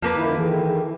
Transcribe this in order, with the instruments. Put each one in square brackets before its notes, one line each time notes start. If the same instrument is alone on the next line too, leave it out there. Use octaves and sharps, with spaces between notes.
[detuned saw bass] F2 [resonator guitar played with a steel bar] F3 A#3 B4
[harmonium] F#2 E4 [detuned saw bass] D#3
[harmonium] D#3 [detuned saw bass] E3 [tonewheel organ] G#4 A4